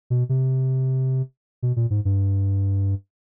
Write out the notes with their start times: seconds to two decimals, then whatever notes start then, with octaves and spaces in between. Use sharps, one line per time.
0.10 B2
0.29 C3
1.63 B2
1.76 A#2
1.90 G#2
2.05 G2